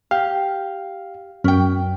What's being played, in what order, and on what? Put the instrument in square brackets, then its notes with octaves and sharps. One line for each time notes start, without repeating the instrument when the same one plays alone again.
[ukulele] G4 [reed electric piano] F5
[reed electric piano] F#2 [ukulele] C#4 G5